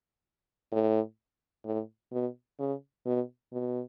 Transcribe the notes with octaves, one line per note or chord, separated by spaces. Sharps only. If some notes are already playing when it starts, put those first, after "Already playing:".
A2
A2
B2
C#3
B2
B2